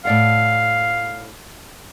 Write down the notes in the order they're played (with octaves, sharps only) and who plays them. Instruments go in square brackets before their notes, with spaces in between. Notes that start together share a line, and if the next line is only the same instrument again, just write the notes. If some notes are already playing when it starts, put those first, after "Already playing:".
[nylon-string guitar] A2 D5 F#5 [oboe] F5